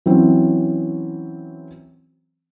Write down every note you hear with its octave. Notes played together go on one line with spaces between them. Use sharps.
E3 F#3 C4 C#4